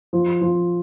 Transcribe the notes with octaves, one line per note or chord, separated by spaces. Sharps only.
F3
F3